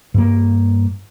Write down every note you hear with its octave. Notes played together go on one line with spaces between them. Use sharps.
G2 A#3